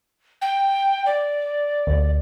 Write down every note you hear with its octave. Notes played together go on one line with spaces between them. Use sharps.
G5
D5
D2